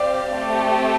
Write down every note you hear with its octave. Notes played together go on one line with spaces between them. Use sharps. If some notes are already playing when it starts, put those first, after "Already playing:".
Already playing: C4 G4 C5 D5 F5
A3 C4 G4